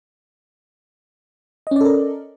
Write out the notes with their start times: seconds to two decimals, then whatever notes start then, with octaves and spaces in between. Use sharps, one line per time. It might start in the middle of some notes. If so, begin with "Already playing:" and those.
1.67 D#5
1.71 C#4
1.76 D5
1.81 A4
1.85 A#4